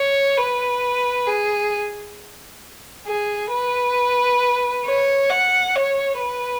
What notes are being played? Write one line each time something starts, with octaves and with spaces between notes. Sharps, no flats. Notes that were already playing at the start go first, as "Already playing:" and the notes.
Already playing: C#5
B4
G#4
G#4
B4
C#5
F#5
C#5
B4